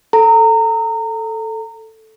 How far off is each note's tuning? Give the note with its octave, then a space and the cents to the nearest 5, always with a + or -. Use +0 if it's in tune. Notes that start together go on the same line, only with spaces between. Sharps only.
A4 +0 A#5 -25